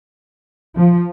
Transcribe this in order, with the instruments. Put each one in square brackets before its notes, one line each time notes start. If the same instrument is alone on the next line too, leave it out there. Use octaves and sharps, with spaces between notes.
[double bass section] F3